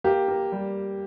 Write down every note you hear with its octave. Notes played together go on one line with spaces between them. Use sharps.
A#3 G4
A#3
G3